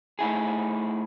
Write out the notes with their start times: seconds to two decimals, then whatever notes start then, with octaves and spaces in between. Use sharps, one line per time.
0.19 A3 D#4 E4 G#4